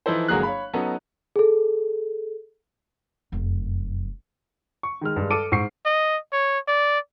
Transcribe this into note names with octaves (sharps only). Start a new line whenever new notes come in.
E3 F3 D#4 E4 A4 C5
G1 F#3 G#3 A#3 G#4 F#6
C#5 F5 B5
F#3 B3 C#4 D#4 A4 D#5
G#4 A4
F1 F#2
C#6
D#3 G#3 F6
G2 G#3
A4 D6 D7 D#7
G#2 C#6 C7
D#5
C#5
D5